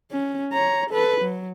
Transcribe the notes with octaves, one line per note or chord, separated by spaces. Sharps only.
C#4
C#5 A#5
A4 B4
F#3